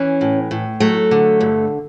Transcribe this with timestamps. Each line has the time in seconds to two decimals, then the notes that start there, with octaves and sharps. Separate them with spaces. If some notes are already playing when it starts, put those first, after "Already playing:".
Already playing: E3 C#4
0.21 A2
0.51 A2
0.80 F#3 A3
1.11 D3
1.40 G2